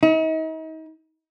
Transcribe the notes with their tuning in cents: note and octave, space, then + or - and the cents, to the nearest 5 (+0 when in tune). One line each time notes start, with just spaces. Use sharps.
D#4 +40